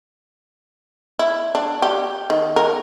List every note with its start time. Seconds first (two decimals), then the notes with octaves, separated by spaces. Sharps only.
1.19 E4
1.55 D4
1.82 G4
2.30 D#3
2.56 A#4